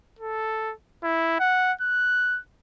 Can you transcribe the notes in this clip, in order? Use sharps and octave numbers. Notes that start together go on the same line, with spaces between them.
A4
E4
F#5
F#6